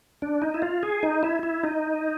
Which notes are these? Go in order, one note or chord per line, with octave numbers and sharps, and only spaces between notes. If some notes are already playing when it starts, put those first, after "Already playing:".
D4
D#4
E4
F4
G#4
D#4
E4
E4
D#4